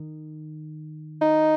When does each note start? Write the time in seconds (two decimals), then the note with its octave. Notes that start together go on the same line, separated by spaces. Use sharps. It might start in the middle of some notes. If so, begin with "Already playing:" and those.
Already playing: D#3
1.21 D#4